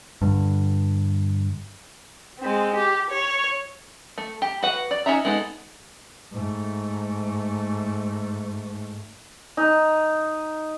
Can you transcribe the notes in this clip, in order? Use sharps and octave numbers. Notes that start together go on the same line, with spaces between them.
G2 D3
G#3 C4
G4
C#5
A3
G4
F#4 B4 F#5
D5
C#4 D#4 F#4 E5 A#5
G#3 B3 D#4 A4
G#2 A3
D#4